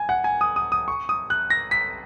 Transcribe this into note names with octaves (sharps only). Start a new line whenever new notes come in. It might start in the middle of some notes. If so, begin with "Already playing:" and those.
Already playing: G#5
F#5
G#5
D#6
D#6
D#6
C#6
D#6
F#6
A#6
B6